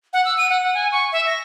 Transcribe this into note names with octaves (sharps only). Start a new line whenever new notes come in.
F#5
E6
D#7
F#5
F#5
G#5
C#6
E5
A#6